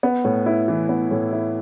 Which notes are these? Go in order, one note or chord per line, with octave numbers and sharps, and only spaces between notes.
B3
A2
E4
E3
B3
A2
E4